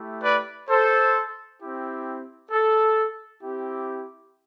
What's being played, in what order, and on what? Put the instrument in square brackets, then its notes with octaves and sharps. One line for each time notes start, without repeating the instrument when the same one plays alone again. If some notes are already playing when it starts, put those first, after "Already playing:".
Already playing: [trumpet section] A3 E4 G4
B4 D5
A4 C5
C4 E4 G4
A4
C4 E4 G4